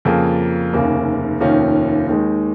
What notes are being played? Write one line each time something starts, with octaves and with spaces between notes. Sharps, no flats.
F2 C#3 A#3 F4 G#4
F1 D#2 C#3 A#3
F1 D#2 D#3 C#4 F4
D#2 D#3 G#3